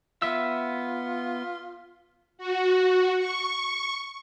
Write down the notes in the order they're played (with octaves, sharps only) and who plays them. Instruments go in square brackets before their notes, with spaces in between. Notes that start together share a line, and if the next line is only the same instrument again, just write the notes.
[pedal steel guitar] B3 E5 E6 [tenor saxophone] F4
[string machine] F#4
C#6